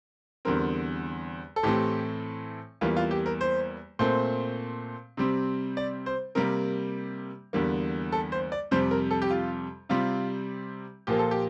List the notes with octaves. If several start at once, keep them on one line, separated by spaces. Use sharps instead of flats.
E2 D3 G3 C4 A#4
A4
A2 E3 A3 C4 G4
E2 E3 G3 A#3 F4
F4
G4
A#4
C5
A#2 A3 C4 C5
C3 G3 C4
D5
C5
C3 G3 A#3 A#4
E2 D3 G3 A#3
A4
C5
D5
F2 C3 G3 C5
A#4
A4
G4
F4
C3 G3 C4 F4
A#2 F3 A#3 G4
A4
G4